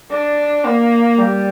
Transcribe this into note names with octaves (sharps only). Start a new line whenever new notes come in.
D4
A#3
G3